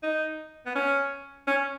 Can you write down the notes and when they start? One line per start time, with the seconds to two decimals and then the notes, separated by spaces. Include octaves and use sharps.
0.03 D#4
0.66 B3
0.75 C#4
1.47 C#4